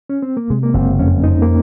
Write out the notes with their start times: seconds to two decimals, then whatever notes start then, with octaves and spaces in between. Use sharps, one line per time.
0.09 C#4
0.22 C4
0.37 A#3
0.50 C3 G#3
0.63 A#3
0.74 F#1 C4
0.99 F2 C#4
1.23 F3 D#4
1.42 A#3